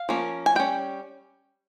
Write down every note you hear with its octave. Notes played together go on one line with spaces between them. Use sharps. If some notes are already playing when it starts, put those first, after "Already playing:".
Already playing: F5
F3 A#3 C#4
G#5
G3 C#4 G5